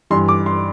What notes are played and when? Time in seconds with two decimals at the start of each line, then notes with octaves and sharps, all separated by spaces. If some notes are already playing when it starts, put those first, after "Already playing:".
0.10 G2 E3 C6
0.28 D6
0.46 C6